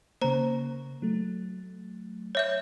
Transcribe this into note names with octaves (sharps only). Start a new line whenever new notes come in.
C#3 A#3 C5 A#5
F#3 A3
C#5 E5 G6